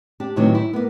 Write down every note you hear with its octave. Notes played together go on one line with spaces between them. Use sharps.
D4 G4
A2 C3 D#3 E3 F#3
E4
A#3 B3